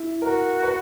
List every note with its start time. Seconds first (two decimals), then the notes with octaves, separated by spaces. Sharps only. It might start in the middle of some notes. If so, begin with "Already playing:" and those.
Already playing: E4
0.22 F#4 A#4
0.63 B4